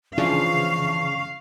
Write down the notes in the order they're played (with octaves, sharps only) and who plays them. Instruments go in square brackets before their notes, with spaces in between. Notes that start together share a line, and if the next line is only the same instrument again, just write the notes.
[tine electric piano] C#3 [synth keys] E3 F3 D4 [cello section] F5 [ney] C#6